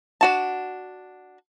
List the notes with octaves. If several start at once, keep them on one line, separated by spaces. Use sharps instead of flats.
D4 F#4 A5